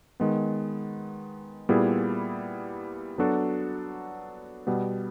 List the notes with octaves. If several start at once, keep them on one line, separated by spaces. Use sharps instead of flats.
D#3 G#3 B3
A#2 G3 B3 E4 G#4
F#3 B3 D4 F#4 A4
B2 G3 B3